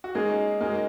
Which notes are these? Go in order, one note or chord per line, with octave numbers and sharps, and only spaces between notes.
F#4
G#3 A#3 C#4 D#4 G#4
G#3 A#3 C#4 D#4 F#4 A#4